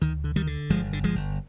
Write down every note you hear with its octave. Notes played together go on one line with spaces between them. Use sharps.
D2 D#3
D3
D#3 G3
D3
G1 F3 G#3
D3
F3 G#3
G1